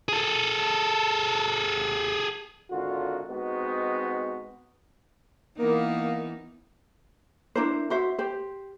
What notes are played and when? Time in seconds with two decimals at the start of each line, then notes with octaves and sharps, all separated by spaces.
0.09 G#4 A4
2.70 G#1 D3 F4 F#4
3.29 G#3 B3 C4 D#4 F#4
5.58 E3 A#3 B3 D#4
7.56 D4 E4 A#4 C5
7.90 F#4 C5 E5
8.18 G4 C5